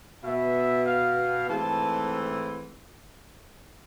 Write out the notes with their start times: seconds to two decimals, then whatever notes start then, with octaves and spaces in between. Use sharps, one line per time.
0.23 B2 B3 E5
0.86 F5
1.49 G#2 E3 A3 C4 A5